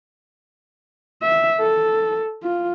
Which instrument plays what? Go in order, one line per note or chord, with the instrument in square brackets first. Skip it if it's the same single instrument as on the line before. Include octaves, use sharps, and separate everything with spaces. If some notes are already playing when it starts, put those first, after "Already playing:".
[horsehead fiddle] E5
A4
F4